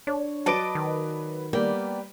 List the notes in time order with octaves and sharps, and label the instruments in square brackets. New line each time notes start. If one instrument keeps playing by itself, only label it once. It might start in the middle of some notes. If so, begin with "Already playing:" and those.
[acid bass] D4 [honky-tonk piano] C#5
[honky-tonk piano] F#3 B4 D7 [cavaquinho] D5 D#5 A5
[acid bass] D#3
[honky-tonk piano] G3 [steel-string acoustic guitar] A#3 B3 D5 [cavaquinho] G5